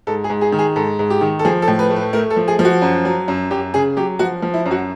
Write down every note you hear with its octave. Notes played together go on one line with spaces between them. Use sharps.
G#2 A4
G#4
G#2
G#4
D#3
G#4
G#2 A4
G#2
G4
D#3
A4
F3 G#4
A4
A2
B4
A3
B4
A3 A#4
A4
F3
G#4
F3
F#4
F#2
F#3
F#2
F#2 G4
C#3 G#4
F#3 G4
F3 F#4
F3
E4
F#2
F#4